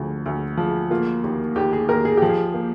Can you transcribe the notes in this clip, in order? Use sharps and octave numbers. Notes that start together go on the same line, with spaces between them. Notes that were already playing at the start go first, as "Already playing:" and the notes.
Already playing: D2 F3
D2
F3
A#3 F4
D#2
D#2 G4
G#4
D#2 A#4
G#4
F3 G4
G#4
A#3